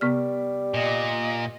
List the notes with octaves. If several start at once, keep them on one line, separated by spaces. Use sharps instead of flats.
C3 G3 B3 F6
A#2 D#5